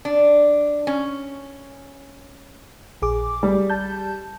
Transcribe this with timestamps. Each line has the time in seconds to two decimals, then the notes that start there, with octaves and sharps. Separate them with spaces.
0.05 D4
0.87 C#4
3.02 A#1 G#4 D6
3.43 G3
3.70 A5 G6